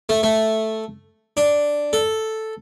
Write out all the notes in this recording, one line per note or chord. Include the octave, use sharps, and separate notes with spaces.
A3
A3
D4
A4